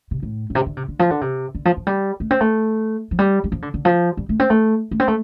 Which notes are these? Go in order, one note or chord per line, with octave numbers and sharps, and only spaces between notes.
C3
A2
A2
C3
D3
C3
D3
F3
D3
C3
D3
F3
F3
G3
A3
C4
A3
F3
G3
G3
F3
D3
D3
F3
G3
A3
C4
A3
A3
C4
A3